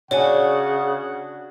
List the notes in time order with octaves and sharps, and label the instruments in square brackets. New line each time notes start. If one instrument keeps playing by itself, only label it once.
[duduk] C#3 [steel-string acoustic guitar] D4 F#4 [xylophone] C#5 G#5 [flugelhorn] F#5